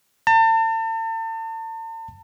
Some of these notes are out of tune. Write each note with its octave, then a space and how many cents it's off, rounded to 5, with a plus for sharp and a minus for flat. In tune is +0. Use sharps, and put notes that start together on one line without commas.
A5 +40